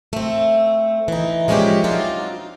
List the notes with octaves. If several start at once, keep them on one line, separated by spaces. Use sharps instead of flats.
A3 C4
E3 D#4
F3 G#3 C#4 D4 E4 G4
F#3 C4 D4 D#4 F4